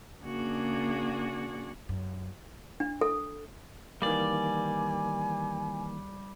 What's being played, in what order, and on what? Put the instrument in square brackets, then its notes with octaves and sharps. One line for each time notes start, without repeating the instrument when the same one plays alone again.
[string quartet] C#3 A#3 D4 F#4 G#4
[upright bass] F#2
[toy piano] D4
A4
[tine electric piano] D#3 E3 A#3 [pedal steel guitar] G3 D5 [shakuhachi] G#5